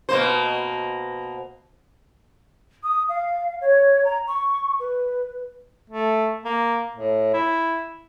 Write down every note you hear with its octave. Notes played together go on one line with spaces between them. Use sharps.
B2 A#3 C5
D#6
F5
C#5
A#5
C#6
B4
A3
A#3
A2
E4